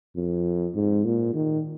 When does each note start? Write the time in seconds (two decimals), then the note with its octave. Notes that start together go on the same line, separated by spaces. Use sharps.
0.16 F2
0.75 G#2
1.05 A#2
1.34 D#3